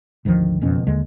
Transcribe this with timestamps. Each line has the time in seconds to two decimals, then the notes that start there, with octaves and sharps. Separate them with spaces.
0.25 G#1 D2 D#3 F3
0.61 F#1 F2 B2 C#4
0.87 D#2 D3 G#3